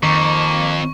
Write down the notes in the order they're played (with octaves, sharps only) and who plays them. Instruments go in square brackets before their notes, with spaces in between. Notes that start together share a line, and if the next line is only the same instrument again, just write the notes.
[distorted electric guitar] F2 [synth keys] D#3 [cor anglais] A#3 [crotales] C#6